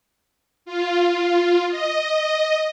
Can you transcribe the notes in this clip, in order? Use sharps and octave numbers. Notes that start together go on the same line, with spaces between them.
F4
D#5